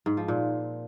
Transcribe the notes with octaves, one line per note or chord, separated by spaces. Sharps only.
G#2
F3
A#2